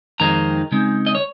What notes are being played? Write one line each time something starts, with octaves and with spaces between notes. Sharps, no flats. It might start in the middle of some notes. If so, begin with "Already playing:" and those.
F2 D#3 G#3 C4 D#4 A#5
C#3 G#3 C4 D#4
D#5
C#5